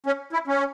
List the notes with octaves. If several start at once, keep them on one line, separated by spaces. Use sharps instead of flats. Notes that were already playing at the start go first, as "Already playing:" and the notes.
C#4
E4
C#4